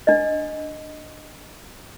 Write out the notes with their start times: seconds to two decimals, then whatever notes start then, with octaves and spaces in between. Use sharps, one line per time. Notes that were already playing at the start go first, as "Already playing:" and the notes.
0.07 D4 D#5